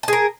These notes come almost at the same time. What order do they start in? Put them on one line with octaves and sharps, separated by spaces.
A5 G#4 A#4